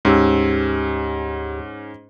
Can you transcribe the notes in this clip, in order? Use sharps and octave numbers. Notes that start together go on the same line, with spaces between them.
D2 G#2 C#4 G4 E6